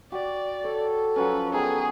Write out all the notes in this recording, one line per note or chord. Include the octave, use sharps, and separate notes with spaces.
F#4 G4 D5
A4 C#5
F3 F#3 C#4 B4
D#3 B3 D#4 G#4